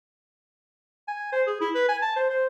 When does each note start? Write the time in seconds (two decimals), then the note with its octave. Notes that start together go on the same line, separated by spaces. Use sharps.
1.08 G#5
1.32 C5
1.47 G#4
1.61 E4
1.75 B4
1.89 G#5
2.02 A5
2.16 C5
2.30 C5